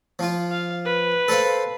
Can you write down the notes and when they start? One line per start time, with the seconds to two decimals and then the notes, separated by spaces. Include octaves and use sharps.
0.19 F3 F4
0.51 F5
0.86 B4
1.28 A4 C5 F5